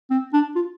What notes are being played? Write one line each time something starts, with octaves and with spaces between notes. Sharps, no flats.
C4
D4
F4